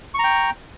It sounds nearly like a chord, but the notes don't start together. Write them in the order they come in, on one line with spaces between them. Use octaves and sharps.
C#6 A#5 G5